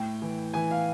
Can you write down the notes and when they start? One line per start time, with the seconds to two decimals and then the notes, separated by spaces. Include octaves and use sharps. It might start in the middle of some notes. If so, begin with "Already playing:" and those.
Already playing: A2 G5
0.22 E3
0.54 E3 G#5
0.71 F5